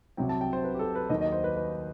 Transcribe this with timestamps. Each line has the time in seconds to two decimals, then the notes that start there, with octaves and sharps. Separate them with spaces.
0.17 C2 C3 F#3 G5
0.29 A5
0.41 G5
0.53 C5
0.64 B4
0.74 G4
0.79 A4
0.95 B4
1.10 D#2 D#3 F#3 D#5
1.21 D#5
1.32 C5
1.44 B4
1.56 B4